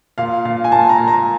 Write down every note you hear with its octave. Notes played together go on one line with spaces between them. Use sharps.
A#2 F5
A#2 F5
G#5
A#2 A5
A#5
A#2
A#5